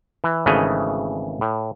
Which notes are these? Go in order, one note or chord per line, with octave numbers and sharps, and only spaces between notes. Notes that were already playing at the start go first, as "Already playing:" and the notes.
E3
G#1 C#3 E3 A3 D#5 G#5
A2